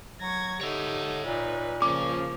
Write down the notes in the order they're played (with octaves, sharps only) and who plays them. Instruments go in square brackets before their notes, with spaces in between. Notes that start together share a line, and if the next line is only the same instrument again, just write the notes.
[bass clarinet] F#3 [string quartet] C#6 G#6 A#6
[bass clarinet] D3 [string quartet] D#4 G4 [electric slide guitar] C#5 E5
[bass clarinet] A#2 [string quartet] D#4 B4
[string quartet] C#3 F3 A#3 [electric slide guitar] C#4 [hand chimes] D6